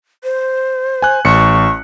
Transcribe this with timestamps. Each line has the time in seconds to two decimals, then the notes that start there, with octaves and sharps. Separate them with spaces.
0.24 C5
1.02 G#5 F#6
1.25 A1 C#6 C#7